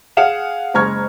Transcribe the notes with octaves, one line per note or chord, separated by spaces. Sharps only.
G#4 F5 F#5 E7
F#1 G#3 A#5 C#6 F6 G#6